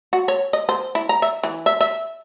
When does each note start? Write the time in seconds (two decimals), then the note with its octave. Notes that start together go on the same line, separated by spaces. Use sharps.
0.13 F#4
0.28 C#5
0.53 D#5
0.69 C5
0.95 E4
1.09 A#5
1.22 E5
1.43 E3
1.66 E5
1.81 E5